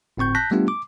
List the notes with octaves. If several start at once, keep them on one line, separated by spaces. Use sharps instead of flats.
G1 A2 C4 C#6 G6
A5 F#6 G6 A#6 B6
G3 A3 B3 D4 F4 G4
D6